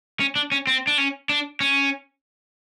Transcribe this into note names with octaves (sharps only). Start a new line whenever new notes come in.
C#4
D4
C#4
C4
D4
C#4
D4
C#4